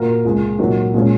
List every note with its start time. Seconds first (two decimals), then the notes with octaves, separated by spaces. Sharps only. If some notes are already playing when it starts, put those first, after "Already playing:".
Already playing: A#2 A#3 F#4 A#4
0.24 C#2 C#3 G#3
0.59 A#2 F#3 A#3 D#4 F#4
0.94 A#2 G#3 C#4